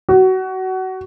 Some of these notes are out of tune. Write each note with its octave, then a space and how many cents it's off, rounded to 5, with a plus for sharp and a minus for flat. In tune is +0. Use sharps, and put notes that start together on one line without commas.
F#4 +20